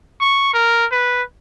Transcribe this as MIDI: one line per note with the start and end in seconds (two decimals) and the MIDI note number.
0.21 0.52 85
0.54 0.85 70
0.92 1.23 71